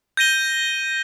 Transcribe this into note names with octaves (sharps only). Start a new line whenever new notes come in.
G6 A#6 D#7 G7